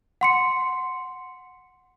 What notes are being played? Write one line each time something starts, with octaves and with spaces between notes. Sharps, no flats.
F#5 C6 C#7